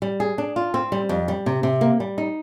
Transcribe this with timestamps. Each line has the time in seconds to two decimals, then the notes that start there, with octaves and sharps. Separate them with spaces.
0.02 G3
0.20 G#4
0.38 D4
0.56 F4
0.74 C4
0.92 G3
1.09 F2
1.28 G3
1.46 C3
1.63 C3
1.81 A#3
2.00 G3
2.18 D#4